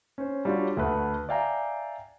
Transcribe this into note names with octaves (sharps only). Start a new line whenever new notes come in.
C#4 C5
G3 D4 F4 F#4 C#5
D2 A3 B4 F#5
D5 E5 F5 G5 G#5 A#5